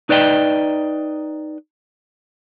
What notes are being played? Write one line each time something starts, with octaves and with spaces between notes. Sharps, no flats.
D#4 B4 D5 D#5 G5